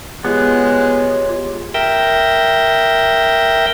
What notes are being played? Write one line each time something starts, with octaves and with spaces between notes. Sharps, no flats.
G#3 B3 F4 G4 C#5
A#4 E5 G5